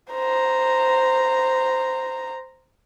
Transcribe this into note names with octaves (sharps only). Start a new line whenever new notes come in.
C5 A#5